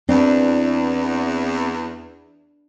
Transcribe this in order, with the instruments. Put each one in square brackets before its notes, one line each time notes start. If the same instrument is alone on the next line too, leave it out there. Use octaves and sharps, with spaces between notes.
[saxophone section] E2 [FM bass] C4 [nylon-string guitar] D4